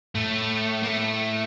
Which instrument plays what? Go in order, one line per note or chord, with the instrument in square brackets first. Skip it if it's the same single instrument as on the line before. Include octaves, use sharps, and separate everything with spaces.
[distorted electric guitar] A2 [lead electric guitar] A3
[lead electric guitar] A#3
A3